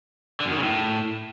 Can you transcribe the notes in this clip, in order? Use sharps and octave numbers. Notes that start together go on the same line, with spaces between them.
D3
F#2
D#3
C#3
A2